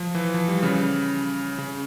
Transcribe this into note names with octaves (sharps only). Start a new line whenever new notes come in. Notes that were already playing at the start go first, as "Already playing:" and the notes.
Already playing: F3
E3
F3
G3
C#3
C#3